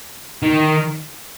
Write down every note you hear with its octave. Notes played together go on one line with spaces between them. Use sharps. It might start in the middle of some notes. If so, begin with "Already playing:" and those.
D#3